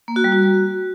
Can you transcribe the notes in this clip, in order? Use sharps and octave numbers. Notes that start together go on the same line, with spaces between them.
A#3
F#4
G3
F#4